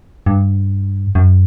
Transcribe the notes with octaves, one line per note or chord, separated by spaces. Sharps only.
G2
F#2